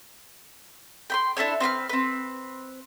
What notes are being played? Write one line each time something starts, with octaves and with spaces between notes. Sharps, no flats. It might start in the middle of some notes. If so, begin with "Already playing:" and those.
G5 B5 C6
D4 E4 A4 C#5
C4 B4 B5 F6
C4 B4